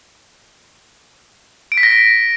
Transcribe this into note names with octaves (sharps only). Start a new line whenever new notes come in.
D7
B6
A#6